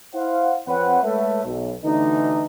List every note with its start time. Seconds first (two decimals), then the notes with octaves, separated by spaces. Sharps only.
0.14 E4 C5 F5 F#5
0.67 F2 C4 B4 C#5 F#5
1.03 G#3 A3 A4 B4 C#5 E5
1.44 B1
1.84 D2 B2 D3 E3 D#4